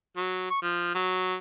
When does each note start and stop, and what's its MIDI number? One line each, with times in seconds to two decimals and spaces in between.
0.17 0.48 54
0.50 0.58 85
0.62 0.93 53
0.95 1.35 54